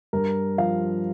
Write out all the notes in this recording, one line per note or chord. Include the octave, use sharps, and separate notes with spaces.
G2 A#4
F3 F5